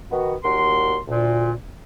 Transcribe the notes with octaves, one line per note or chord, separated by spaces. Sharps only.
D#3 B3 F#4
D#2 A#2 F#4 A#4 C6
D2 A#2